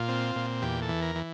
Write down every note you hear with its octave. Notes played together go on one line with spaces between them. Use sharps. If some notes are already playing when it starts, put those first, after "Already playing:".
Already playing: A#2 F4
C4
A#2
E2 G4
A4
E3
A#4
E3